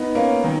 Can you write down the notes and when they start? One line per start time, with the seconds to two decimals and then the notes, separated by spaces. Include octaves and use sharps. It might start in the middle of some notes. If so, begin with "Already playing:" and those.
Already playing: B3 D#4
0.15 A#3 C#4
0.44 D#3 F#3